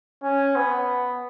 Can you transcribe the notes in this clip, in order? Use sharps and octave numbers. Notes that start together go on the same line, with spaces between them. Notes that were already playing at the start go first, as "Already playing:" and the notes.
C#4
B3